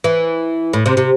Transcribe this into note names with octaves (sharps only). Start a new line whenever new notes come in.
E3
A2
C3
C3